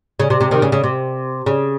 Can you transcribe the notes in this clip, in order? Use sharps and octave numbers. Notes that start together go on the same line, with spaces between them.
C#3
C3
C3
C3 D#3
C#3
C#3
C3
C#3